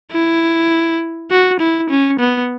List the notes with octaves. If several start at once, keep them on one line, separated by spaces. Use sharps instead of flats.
E4
F#4
E4
C#4
B3